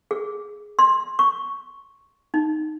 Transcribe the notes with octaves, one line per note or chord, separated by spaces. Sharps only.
G#4
C6
C#6
D#4